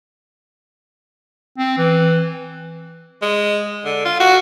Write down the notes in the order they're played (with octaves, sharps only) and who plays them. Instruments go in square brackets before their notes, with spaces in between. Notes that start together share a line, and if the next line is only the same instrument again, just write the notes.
[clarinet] C4
E3
[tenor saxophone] G#3
D3
F4
F#4